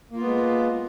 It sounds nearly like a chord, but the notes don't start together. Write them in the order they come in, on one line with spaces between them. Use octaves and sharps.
A#3 F4 B3 G#3